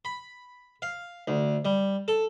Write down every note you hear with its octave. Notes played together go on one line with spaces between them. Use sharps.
B5
F5
D2
G3
A4